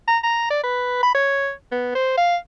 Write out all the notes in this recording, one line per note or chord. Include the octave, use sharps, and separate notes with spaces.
A#5
A#5
D5
B4
B5
C#5
B3
C5
F5